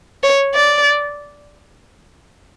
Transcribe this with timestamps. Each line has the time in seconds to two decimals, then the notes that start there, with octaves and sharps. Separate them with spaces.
0.23 C#5
0.55 D5